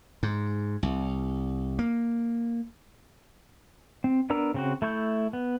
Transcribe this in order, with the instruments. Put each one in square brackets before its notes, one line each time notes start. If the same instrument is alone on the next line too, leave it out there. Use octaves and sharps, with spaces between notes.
[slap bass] G#2
C2
A#3
[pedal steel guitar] C4
B3 D4 A#4 A#5 E6
C#3 C4 F#4
A3 E4 C#6 G6
B3